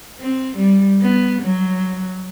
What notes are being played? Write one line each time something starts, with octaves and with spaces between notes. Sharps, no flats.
C4
G3
B3
F#3